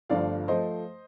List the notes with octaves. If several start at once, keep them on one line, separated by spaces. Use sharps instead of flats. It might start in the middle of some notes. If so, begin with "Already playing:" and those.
G1 G2 F3 A3 D5 F5
F3 A3 C5 D#5